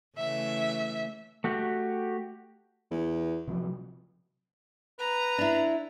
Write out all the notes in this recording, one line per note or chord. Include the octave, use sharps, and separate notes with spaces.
C#3 E3 A3 E5
A3 F#4 G4
E2
C3 F3 F#3
B4 A#5
D4 E4